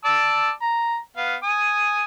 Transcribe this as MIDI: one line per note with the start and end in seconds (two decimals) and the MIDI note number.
0.05 0.51 74
0.05 0.51 81
0.05 0.51 88
0.62 0.98 82
1.17 1.36 59
1.17 1.36 77
1.43 2.05 80
1.43 2.05 87